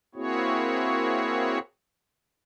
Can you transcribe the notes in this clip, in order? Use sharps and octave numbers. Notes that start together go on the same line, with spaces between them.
A#3 C4 E4 F#4 G#4 C#5